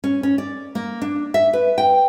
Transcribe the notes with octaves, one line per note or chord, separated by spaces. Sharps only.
C#4
C#4
D5
A#3
D4
E5
B4
G5